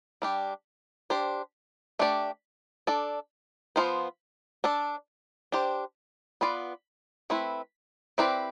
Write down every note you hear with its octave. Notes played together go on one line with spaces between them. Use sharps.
G3 D4 G4
D4 G4 C5
A3 D4 G4 D5
D4 A4 D5
F3 B3 F4 C5
D4 A4 D5
D4 G4 C5
B3 F4 B4 D5
A3 C4 E4 B4
C4 E4 G4 B4 D5